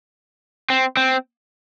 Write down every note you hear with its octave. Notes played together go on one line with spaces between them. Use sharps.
C4
C4